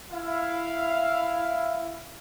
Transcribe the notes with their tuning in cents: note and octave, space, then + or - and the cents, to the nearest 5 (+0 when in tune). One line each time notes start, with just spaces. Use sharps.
E4 +15 F5 +0